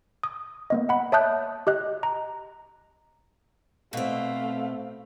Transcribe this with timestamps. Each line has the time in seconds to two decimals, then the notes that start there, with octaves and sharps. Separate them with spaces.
0.23 D#6
0.70 A#3 B3 D#5
0.89 F#5 B5
1.12 C#5 E5 A5 D#6 F#6 G6
1.67 G4 D#5 F#6
2.03 A#5
3.93 B2 A3 C4 F5